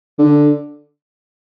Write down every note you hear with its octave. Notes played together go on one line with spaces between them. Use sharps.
D3